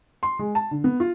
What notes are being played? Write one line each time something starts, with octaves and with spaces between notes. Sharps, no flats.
C6
G#3
A5
D3
B3
F4